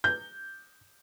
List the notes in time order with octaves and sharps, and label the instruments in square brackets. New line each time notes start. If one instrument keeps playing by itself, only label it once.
[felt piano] G6